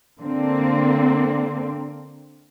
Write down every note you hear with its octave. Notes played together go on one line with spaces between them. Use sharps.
D3 A#3 C4